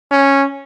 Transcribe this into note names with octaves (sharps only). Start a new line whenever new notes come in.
C#4